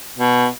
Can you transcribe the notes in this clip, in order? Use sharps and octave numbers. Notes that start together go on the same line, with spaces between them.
B2